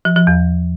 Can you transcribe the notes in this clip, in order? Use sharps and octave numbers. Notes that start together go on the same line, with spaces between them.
F3
F3
E2